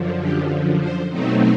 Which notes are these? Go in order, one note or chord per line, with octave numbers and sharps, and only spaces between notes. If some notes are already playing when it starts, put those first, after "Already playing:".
Already playing: F#2 D3 F3
G4
C5
B2 F#3 A3 C4 D#4